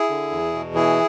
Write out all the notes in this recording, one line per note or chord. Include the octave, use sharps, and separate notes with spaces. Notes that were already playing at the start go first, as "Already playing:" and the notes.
Already playing: E4 G#4
D3
E2
B2
E3 E4 G#4